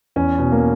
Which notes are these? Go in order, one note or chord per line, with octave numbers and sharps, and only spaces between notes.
E2 C#4
B2
A#3